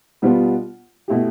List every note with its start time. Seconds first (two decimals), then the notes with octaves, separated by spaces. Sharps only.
0.22 B2 G3 B3 D4 F4
1.08 B2 A3 E4 G4